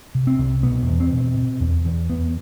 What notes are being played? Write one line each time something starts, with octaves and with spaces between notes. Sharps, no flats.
C3
C4
C2
B2 B3
E2
C4
B2
B2
E2
E2
E2 B3